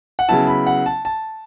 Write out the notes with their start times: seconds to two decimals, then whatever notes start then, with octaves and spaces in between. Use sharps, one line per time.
0.19 F#5
0.28 C#3 F#3 B3 E4 A5
0.47 B5
0.67 F#5
0.86 A5
1.05 A5